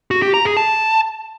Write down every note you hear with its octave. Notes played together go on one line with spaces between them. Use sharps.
F#4
G4
A#5
G#4
A5